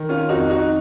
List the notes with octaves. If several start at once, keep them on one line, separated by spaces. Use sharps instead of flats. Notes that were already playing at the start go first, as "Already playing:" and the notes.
Already playing: D#3
C#4 F4
F2 D#4 F#4
D#4 F#4